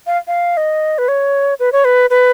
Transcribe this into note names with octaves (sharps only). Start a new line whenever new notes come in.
F5
F5
D#5
B4
C#5
B4
C#5
B4
B4